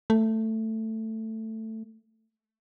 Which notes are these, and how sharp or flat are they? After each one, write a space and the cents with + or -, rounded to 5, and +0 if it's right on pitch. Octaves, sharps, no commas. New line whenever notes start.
A3 +10